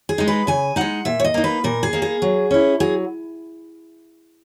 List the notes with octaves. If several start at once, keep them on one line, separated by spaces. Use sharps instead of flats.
G#4
G#3 D#4
B4
C#3 G#5
G#3 D#4 F#5
A#2 E5
C#5
D#5
A#3 D#4
B4
A#2 A#4
G#4
A#3 D#4
G#4
F#3
C#4 E4
F#3 G#4